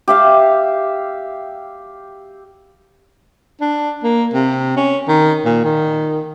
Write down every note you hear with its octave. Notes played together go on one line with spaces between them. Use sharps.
G4 E5 F5
D4
A#3
C3
C#4
D#3
A#2
D#3